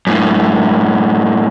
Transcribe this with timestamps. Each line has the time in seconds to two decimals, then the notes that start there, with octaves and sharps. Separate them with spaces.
0.07 F#2 A2